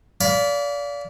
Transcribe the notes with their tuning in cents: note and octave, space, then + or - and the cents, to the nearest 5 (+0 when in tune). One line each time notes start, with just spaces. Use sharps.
D5 -30 F5 +0 B5 +0